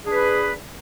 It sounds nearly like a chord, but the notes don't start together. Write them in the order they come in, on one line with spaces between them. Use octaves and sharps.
G#4 D4 B4